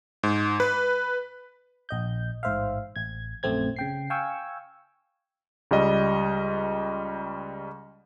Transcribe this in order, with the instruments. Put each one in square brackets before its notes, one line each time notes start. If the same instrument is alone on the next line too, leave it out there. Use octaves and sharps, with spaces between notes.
[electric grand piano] G#2
B4
[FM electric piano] A#1 D#5 G6
A1 G#2 C5 E5 F5
A1 G#6
A#1 F#2 A3 C4 G#6
C#3 G5 C7
F5 G5 G#5 C#6 E6
[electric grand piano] C#2 G3 D#5